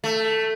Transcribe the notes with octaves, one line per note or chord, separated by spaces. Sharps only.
A3